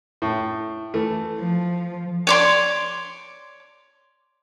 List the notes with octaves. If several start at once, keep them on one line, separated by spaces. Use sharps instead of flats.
A2
E3 A3
F3
C#5 D5 C6